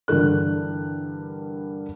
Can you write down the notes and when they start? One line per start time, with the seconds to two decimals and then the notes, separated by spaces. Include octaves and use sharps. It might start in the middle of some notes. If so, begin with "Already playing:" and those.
0.08 G2 D3 E3 A#4 F#6